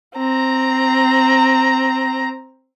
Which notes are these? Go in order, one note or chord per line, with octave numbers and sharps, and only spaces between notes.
C4 A#5